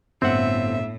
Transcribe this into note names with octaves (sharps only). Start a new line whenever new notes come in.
G1 A2 C4 E5 F#5